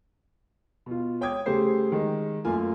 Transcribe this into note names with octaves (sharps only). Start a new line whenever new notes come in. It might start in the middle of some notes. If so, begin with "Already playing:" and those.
B2 F4
C#5 G5 D6 D#6 G#6
C#3 G3 A3 G4 C5 C7
D#3 G#3
F#2 A3 A#3 F4 G#5